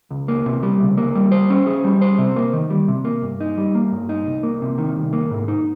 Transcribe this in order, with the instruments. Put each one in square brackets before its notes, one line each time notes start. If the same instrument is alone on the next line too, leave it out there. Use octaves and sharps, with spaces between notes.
[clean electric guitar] C#2
A#3
C3
G3
C#2
A#3
G3
C5
C#4
G#4
G3
C5
C3
A#3
D#3
G3
C3
A#3
G2
D#4
G3
A#3
G2
D#4
C2
A#3
C3
D#3
C2
A#3
G#2
D#4